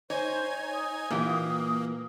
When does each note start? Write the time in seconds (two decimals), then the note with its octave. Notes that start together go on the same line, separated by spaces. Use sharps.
0.10 D#4 C5 C#5 G#5 G#6
0.74 D#6
1.10 A#2 E3 A#3 G4